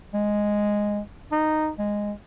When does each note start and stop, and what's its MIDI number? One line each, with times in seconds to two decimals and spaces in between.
0.14 1.00 56
1.32 1.70 63
1.79 2.12 56